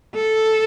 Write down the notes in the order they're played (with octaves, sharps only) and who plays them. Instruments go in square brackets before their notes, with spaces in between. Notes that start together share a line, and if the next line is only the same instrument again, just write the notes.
[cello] A4